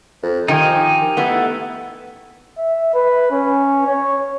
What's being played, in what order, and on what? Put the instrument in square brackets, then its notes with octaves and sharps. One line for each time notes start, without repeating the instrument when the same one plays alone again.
[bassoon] F2
[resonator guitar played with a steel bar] D#3 F3 [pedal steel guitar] D#4 G#5 [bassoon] G4
[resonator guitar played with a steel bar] A3 B3 E4
[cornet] E5
B4
C#4
C#5